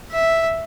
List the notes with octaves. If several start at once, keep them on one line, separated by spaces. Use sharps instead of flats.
E5